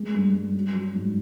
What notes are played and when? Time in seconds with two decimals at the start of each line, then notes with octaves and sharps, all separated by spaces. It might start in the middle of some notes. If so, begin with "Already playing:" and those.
Already playing: G#3
0.14 G2
0.34 G2
0.55 F#3
0.75 F#3
0.95 G#2